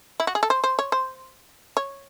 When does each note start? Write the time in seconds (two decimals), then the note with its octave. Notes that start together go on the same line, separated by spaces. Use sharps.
0.20 E4
0.27 F#4
0.35 G#4
0.43 A4
0.50 C5
0.64 C5
0.79 C#5
0.92 C5
1.77 C#5